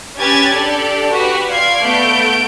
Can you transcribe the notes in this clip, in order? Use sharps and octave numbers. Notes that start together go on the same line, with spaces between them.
C#4 G4 B4 G#5 G#6 A6
D4 G4 A4 D5
F#4 G4 B4
F4 D5 F5 G#6 C7
A3 B3 G6 D7